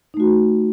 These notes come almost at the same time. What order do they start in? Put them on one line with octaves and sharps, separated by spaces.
D#4 A3 F#4